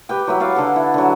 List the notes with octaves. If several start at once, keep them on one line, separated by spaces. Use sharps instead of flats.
G4 B4 G5
F#3 E4 B4 E5
C#5 D5 F5 F#5
D3 A4
E4
D3 F#3